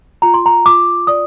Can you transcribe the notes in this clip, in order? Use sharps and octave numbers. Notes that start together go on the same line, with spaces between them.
F4 A#5
C6
A#5
F4 D6
D5 D#6